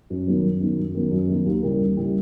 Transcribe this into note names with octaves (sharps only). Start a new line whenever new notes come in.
F#2
D#3 F#3 B3 D#4
F#2
D#3 F#3 B3 D#4
F#2
D#3 F#3 B3 D#4
F#2
D#3 F#3 B3 D#4
D#2
C#3 E3 G3 A#3
D#2
C#3 E3 G3 A#3